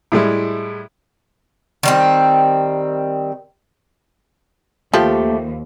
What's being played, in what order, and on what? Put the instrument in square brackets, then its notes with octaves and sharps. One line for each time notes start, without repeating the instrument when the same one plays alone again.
[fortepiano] A2 G3 G#3 E4
[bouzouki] D#3 G3 C4
[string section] D#2 [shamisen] F3 [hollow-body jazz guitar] A3 G4